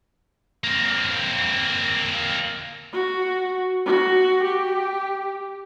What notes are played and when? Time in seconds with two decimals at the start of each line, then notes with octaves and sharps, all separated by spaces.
0.64 A#3 C4
2.93 F#4
3.86 F#4
4.44 G4